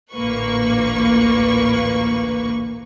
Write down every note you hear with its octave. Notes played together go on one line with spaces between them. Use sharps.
A1 D2 A#2 A#3 B4 C#6